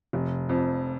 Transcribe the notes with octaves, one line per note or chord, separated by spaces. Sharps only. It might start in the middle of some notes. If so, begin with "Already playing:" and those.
F1
F2